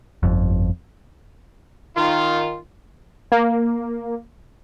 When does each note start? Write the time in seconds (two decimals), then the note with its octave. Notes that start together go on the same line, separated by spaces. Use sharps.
0.23 G1 F2
1.96 D#3 F4
3.32 A#3